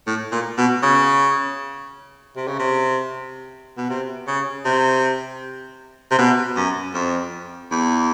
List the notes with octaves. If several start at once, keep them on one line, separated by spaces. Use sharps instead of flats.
A2
A#2
B2
C#3
C3
C#3
C3
B2
C3
C#3
C3
C3
B2
F#2
F2
E2